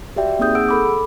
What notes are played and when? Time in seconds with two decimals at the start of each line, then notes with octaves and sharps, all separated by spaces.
0.16 F#4 G4 D5 E5 G5
0.39 A#3 C4 D#4 G#4 D#6 G6
0.55 G#4 F#5 E6 D7
0.69 A4 B5 D6
0.85 B5